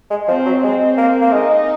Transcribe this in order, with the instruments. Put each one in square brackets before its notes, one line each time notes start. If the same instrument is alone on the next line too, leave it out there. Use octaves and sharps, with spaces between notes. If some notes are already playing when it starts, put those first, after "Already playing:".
[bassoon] G#3
[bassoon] F3 [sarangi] C4
[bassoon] F#3
[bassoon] G#3 [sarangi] C4
[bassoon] A#3
A#3
[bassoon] G#3 [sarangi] D#4